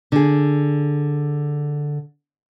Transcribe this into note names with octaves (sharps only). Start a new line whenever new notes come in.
D3 G#4